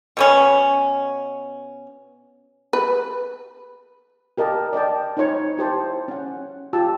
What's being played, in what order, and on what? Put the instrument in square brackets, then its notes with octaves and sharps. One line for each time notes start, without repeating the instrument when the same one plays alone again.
[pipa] B2 B3 C#4
[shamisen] B4
[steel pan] G4 A#4 D#5 A5
D5 D#5 G5 A5
D#4 C5 C#5 C#6
E4 G4 C5 A5
C#4 F#5
F4 G4 G5 A5 E6